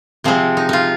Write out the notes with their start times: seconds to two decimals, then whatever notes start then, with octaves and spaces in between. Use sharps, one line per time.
0.24 C3 F3 G#3 C4
0.57 D#4
0.69 D#4 F4